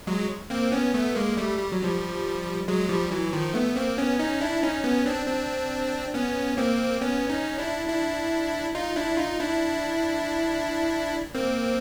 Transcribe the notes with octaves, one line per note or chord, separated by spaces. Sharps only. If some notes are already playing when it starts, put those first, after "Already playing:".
F#3 G#3
A#3 C4
B3 C#4
A3 B3
G#3 A#3
G3 A3
G3
F#3
F3 G3
F#3 G#3
F3 G3
E3 F#3
D#3 F3
A3 B3
A#3 C4
B3 C#4
C#4 D#4
D4 E4
C#4 D#4
B3 C#4
C4 D4
C4 D4
B3 C#4
A#3 C4
B3 C#4
C#4 D#4
D4 E4
D4 E4
D#4 F4
D4 E4
D#4 F4
D4 E4
A#3 C4